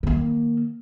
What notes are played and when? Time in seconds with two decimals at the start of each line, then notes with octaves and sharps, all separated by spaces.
0.03 D#3 A#3